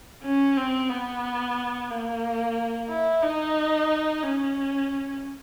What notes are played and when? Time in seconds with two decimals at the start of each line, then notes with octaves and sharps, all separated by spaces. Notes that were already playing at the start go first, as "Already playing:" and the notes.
0.23 C#4
0.56 C4
0.90 B3
1.90 A#3
2.89 E4
3.23 D#4
4.23 C#4